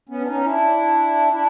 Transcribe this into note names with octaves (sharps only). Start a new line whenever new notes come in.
B3 C#4
D4
C#4 D#4
D4 E4
D4 E4